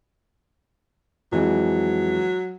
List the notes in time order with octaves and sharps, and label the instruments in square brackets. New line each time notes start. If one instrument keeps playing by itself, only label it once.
[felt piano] F2 E3 G#3 [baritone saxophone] F#3